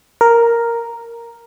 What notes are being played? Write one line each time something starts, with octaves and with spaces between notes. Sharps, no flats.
A#4